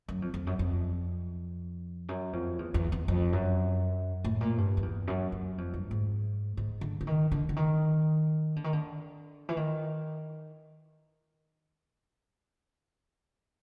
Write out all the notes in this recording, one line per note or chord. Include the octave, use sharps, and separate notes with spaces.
F#2
F2
F2
F#2
F2
F#2
F2
E2
E2
E2
F2
F#2
A2
A#2
G2
F2
E2
F#2
F#2
F2
G2
G#2
G#2
D3
D3
D#3
D3
D3
D#3
D3
D#3
D3
E3
D#3